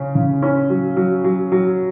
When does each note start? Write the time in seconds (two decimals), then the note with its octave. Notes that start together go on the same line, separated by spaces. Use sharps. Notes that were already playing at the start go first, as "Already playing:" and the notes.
Already playing: C#3 C#4
0.15 C#3
0.43 C#4
0.70 F#3
0.97 F#3
1.24 F#3
1.52 F#3